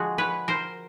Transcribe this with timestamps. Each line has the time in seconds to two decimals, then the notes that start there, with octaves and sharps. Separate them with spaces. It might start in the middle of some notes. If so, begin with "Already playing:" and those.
Already playing: D3 F3 G#3 F#4 G#4
0.18 B4 C#5
0.48 A#4 C5